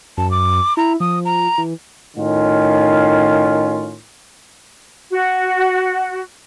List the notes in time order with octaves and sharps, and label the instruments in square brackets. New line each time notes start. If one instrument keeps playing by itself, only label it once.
[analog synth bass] F#2 [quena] A5
[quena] D6
[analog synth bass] E4 [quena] A#5
[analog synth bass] F3 [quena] D#6
[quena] A#5
[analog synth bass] E3
[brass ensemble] A2 D#3 C#4 F4
[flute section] F#4